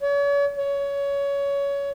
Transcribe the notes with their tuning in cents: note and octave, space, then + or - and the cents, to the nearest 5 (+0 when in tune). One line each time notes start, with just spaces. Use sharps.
C#5 +40
C#5 +20